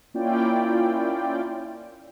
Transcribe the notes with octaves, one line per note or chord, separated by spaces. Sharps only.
A#3 C#4 E4 F4 D5 G5